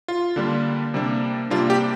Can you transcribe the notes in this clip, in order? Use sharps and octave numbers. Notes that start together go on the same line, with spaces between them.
F4
D3 G3 A#3 D4
C3 G3 A#3 D4
C3 G3 A#3 D4 F4
G4